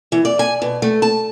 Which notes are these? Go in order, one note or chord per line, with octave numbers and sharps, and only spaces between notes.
E3
D5
G#5
B2
A3
A5